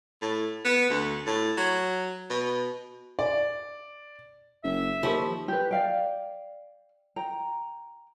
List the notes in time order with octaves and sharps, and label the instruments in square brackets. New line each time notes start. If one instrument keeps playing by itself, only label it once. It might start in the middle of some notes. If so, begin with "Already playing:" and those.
[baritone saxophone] A2
B3
D2
A2
F#3
B2
[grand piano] D5
[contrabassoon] F#1 [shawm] E5
[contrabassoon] D#2 [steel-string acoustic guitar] F3 [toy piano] F4 G4 A#4
[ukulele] G4 B4
D5 F5 G5
G5 A#5